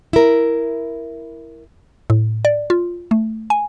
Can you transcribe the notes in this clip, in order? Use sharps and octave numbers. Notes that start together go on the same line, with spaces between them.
E4 A#4
A2
D5
F4
A3
G#5